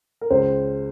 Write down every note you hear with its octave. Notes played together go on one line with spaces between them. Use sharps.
A#4
C#2 C5